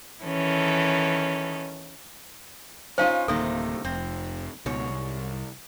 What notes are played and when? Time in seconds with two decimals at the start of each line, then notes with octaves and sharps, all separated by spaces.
0.22 D#3 E3 C#4 A4
2.98 C#4 D#4 F4 C5 F5
3.28 D1 C3 D#3 A3 A#3 A4
3.85 F1 C4
4.66 C#2 G#2 B2 C#5
4.89 C2